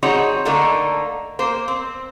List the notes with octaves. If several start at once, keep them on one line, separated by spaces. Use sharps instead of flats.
G3 C4 D#4 F#4 G#4 C#5
D3 A3 A#3 D#4 A4 A#4
A#3 C5
C4